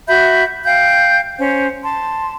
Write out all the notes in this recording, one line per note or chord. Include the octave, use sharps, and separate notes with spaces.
F#4 E5 B5 G6
F5 G5 G6
C#4 C5
A5 C6